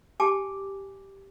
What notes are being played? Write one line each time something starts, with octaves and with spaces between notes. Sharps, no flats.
G4 G#5 A5 D6